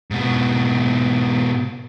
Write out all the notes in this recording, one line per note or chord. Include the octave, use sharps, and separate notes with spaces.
G#2 B2